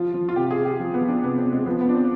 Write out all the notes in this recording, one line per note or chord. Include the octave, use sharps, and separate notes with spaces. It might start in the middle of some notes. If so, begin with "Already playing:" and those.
Already playing: F3 F4
F3
F4
C3 G4
G#4
C3
G4
F3
B3
F3
D4
C3 B3
C4
C3
G#3
F3 B3
B3
F3 D4
C4